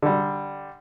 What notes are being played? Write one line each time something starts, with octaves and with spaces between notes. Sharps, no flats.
D3 G3